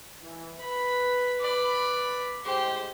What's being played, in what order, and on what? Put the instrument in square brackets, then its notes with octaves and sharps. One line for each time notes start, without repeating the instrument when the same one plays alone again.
[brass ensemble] E3
[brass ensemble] B4 [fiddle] B5
[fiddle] D5 B5
[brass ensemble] A2 G#3 [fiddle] G4 C5